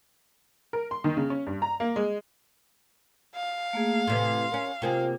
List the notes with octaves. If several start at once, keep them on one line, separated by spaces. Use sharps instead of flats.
A#4
C6
D#3
C#3
C#4
G2
A#5
A#3
G#3
F5
A3 A#3 G#4
A2 C3 E3 C6
C#4 A#4
C3 A#3 F4 G#4 C5 G5